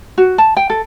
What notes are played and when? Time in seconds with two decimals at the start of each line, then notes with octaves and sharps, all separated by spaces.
0.18 F#4
0.38 A5
0.57 G5
0.70 A4